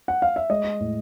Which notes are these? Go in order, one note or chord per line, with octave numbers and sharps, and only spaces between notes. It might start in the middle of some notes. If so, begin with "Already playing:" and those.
F#5
F5
E5
G#3 D#5
A2